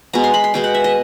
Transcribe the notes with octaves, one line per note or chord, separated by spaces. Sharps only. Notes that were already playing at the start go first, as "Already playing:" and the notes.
B2 G#3 B3 A#5
C6
B5
C6
B2 G#3 B3 G5
F#5
E5
D#5